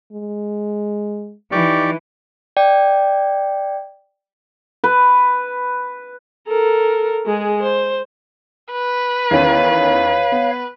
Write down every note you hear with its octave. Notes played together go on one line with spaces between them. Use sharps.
G#3
E3 D#4 G4 D5 C#6
D5 G5
B4
A4 A#4
G#3 G#4
C5
B4
E2 D#3 C#4 C#5 F5
B3